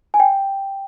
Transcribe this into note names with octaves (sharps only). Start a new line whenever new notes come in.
G#5
G5